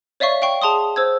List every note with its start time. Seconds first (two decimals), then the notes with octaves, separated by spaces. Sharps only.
0.20 C#5 D5 E5 F5 C#6
0.42 F5 G5 C#6
0.62 G#4 A5 C6 D#6
0.96 C5 E6 G#6